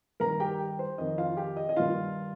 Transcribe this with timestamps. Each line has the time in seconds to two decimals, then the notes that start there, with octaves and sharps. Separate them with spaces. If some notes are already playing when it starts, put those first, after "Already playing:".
0.20 G2 D#3 A#4 A#5
0.40 G4 G5
0.79 C5
0.98 F2 D#3 D#5
1.18 F4 F5
1.37 G4 G5
1.57 D#5
1.69 D#5
1.76 G2 D#3 F4 F5